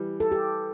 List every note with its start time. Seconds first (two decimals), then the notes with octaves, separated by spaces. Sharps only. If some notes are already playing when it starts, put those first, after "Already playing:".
Already playing: E3 G3
0.20 A4
0.32 G4